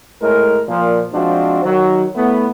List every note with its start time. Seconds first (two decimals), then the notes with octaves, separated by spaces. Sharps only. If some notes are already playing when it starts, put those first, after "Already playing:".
0.22 A2 G#3 A#4
0.68 A#2 F3
1.13 F3 G#3 C4 D4 F#4
1.64 D#3 F#3
2.16 A2 A3 B3